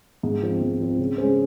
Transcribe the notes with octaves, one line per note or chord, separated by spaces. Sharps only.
G#2
F3 C4
G#2
F3 C4
C#3
G#3 C#4 G#4 C5